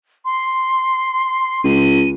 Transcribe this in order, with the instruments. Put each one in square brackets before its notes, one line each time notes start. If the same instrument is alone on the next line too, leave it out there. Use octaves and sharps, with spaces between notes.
[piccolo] C6
[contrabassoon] C#2 [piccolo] D#7